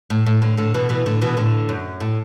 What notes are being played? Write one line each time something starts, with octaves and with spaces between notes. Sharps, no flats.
A2
A2
A2 D3
A2 D3
B2 E3
B2 E3
A2 D3
B2 E3
A2 D3
F#2
A2